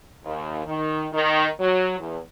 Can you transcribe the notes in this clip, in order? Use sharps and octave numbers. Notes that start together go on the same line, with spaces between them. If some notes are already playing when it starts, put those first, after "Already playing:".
D#2
D#3
D#3
F#3
E2